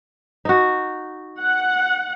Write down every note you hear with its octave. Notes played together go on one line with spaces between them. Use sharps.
D#4 F#4
F#5